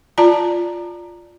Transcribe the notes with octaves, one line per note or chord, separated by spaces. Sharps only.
F4 D5 A5 A#5